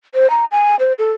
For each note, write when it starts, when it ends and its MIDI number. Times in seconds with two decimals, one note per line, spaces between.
0.14 0.30 72
0.30 0.45 82
0.51 0.76 80
0.79 0.93 72
0.99 1.12 69